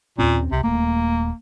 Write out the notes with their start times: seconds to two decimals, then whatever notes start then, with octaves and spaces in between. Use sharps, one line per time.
0.19 D#2 A#2 C4 C#4
0.52 C2 C3
0.63 D#1 A3 A#3